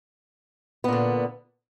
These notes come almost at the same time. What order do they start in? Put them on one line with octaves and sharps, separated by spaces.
B3 A#2 D3